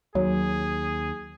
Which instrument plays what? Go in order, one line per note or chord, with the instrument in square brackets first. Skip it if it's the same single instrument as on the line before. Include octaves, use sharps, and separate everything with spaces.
[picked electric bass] D#2 [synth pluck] F#3 [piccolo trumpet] G#4